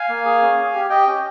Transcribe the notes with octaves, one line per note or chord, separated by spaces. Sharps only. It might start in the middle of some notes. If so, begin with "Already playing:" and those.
Already playing: F5 G#5
A#3
G#4
C#4
C#4
G4
G4 D#5 G5
C#4